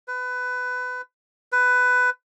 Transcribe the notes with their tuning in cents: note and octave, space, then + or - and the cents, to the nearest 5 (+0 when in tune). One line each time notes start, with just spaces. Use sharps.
B4 +20
B4 +15